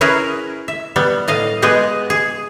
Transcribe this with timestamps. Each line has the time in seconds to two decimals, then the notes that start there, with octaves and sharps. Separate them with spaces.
0.01 C#4 E4 G#4 A#4 B4
0.68 E5
0.96 G3 B3
1.28 A2 D#5 F5
1.62 G#3 B3 G4 G#4 D#5
2.10 G#4